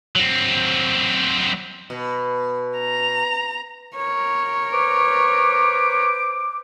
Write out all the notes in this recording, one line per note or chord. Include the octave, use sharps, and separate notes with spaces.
F#3 C4
B2
A#5
A#4 C#5
B4 C5 D6